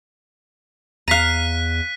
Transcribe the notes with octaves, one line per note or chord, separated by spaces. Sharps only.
E2 F5 A#5 F#6 B6 D#7